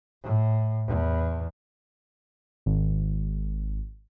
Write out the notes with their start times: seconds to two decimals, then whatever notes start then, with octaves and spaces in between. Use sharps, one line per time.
0.23 A2
0.87 E2
2.66 G#1